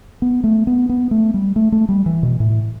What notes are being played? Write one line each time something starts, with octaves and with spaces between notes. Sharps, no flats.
B3
A3
B3
B3
A3
G3
A3
A3
G3
E3
B2
A2